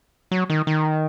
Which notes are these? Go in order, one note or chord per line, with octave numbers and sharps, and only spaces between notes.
F#3
D#3
D#3